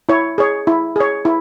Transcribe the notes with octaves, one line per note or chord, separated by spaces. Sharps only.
E4 C#5
G#4 C#5
E4
G#4 C#5
E4